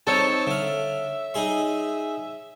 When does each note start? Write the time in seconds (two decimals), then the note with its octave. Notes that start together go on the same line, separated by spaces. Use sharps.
0.07 C4 D#4 A4 C#5 A5
0.47 D3 E5 F5
1.34 D#4 G#4 C6